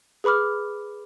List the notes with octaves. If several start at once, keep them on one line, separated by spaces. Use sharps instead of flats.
G#4 B4 B5 D6 F6